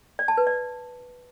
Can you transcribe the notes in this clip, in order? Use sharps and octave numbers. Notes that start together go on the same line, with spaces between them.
D5
A5
B4
D5